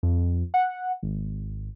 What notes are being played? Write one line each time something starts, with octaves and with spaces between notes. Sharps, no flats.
F2
F#5
G#1